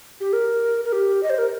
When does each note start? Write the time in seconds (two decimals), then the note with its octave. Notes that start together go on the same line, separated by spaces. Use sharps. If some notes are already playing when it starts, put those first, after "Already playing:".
0.21 G4
0.33 A#4
0.85 A#4
0.93 G4
1.23 D#5
1.30 C5
1.38 A#4